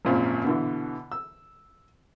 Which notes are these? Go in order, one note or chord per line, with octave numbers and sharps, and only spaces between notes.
G#1 F#2 A#2 F3
B2 D3 E3
E6